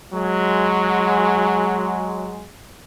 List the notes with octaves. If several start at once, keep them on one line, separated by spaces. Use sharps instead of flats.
F#3 G#3